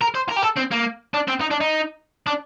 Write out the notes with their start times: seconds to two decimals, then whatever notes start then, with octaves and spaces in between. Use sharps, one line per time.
0.01 A#4
0.15 C5
0.29 A#4
0.37 G4
0.43 A4
0.57 C4
0.72 A#3
1.14 D4
1.28 C4
1.41 D#4
1.51 D4
1.61 D#4
2.27 D4